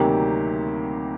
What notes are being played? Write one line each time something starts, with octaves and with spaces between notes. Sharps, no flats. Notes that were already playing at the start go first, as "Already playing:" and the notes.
Already playing: D2 C3 D#3 F#3 A#3 G4